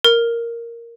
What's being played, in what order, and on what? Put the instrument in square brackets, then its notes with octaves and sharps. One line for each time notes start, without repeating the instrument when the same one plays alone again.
[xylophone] A#4